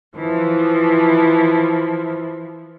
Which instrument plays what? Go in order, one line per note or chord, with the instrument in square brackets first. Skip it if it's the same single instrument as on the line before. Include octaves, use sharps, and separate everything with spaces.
[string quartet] E3 F3